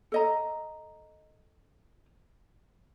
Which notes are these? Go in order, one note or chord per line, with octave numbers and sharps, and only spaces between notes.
A4 D#5 A#5